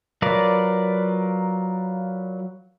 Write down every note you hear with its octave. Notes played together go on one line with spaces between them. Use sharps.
F#3 F4 A#4 B4 D5